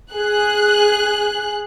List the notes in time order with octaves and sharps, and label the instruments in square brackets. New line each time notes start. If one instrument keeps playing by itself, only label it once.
[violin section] G#4 F#6